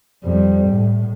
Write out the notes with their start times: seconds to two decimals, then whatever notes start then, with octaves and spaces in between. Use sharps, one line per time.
0.23 F2 G3
0.68 A2